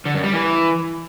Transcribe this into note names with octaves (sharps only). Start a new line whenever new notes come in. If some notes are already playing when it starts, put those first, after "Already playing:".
D3
F#2
G3
E3